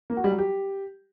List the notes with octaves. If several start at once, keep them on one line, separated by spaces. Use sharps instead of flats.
A#3
F#4
G3
F#3
G4